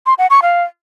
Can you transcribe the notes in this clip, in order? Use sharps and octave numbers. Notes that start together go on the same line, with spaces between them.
C6
F#5
C#6
F5